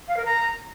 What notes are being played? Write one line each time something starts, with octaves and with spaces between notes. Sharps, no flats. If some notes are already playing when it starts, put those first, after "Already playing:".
F5
A#4
A#5